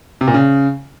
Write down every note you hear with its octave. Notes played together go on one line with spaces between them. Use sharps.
C3
A#2
C#3